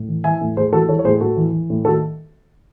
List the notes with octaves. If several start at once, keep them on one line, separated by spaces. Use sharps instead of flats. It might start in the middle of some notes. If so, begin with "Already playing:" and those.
Already playing: A2
E3
E3 E5 G#5
A2
A2 G#4 C5
E3 F#4 A4
E3 A4 C#5
C#5
A2 G#4 C5
A2 F#4 A4
E3
E3
A2
D#3 F#4 A4